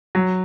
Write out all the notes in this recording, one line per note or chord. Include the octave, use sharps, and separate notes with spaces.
F#3